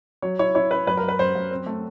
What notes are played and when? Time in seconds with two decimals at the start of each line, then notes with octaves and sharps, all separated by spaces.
0.22 F#3 C#5
0.39 E4 C#5
0.55 E4 C#5
0.71 E4 B4
0.87 F#2 B4
0.97 A#4
1.03 F#2
1.09 B4
1.19 F#2 C5
1.35 F#2
1.51 C4
1.66 A3